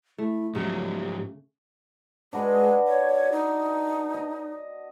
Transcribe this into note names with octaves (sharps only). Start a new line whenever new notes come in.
A3 E4
G#2 C#3 F3 F#3 C#4 D#4 G4
G#3 D4 F#4 B4
C#5
D#4
D#5